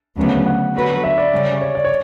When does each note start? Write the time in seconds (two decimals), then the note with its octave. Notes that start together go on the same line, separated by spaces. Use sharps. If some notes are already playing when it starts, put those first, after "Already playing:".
0.17 D2 C#3 F#3 B3
0.46 F#5
0.74 D3 F#3 B3 F#4 B4
1.04 E5
1.18 D5
1.32 C#3 G3 C#4
1.61 C#5
1.75 D5
1.85 C#5